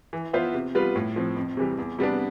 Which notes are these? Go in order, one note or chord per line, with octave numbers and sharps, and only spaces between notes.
E3
B3 F4 C5 E5
C3
G3 B3 F4 B4
A2
F3 C4
F2
C3 E3 G3
E2
C3 G3 B3 D4